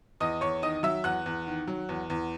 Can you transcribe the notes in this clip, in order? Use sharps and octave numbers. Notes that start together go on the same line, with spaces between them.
E2 D#5 D#6
E2 C#5 C#6
D#3 D#5 D#6
F#3 E5 E6
E2 F#5 F#6
E2
D#3
F#3
E2
E2